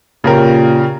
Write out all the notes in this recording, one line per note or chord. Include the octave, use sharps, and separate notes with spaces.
A#2 C#3 G4 A#4